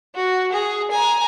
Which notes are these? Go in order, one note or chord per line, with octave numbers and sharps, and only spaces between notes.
F#4
G#4
G#5 A#5